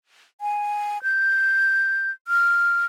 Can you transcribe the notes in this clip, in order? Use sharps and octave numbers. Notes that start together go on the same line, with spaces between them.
G#5
G6
F6